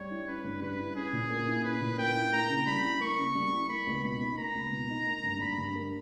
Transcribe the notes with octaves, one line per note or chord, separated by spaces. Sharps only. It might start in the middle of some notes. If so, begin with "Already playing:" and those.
Already playing: G3 C#5
E4
C#4 B4
G2
G3 B4
E4
C#4 G#4
A#2
A#3
E4
C#4 B4
A#2
A#3 G5
E4
A#3 A#5
C#3
G3 B5
E4
A#3 C#6
C#3
G3
E4
A#3 B5
C#2
B2 B5
D#4
A#3 A#5
C#2
B2
D#4
A#3
G2
G3 B5
G2
A#3